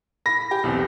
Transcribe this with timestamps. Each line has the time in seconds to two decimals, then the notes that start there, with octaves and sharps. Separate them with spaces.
0.26 B5 A#6
0.51 G4
0.63 B1 E2 C3